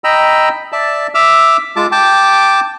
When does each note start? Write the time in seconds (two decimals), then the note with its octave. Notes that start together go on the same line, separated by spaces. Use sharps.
0.04 D#5 G5 A#5 B5 E6
0.72 D5 E5 A5
1.14 E5 D6 E6 F6
1.76 G#3 F4 A5 D6
1.92 G5 A5 D6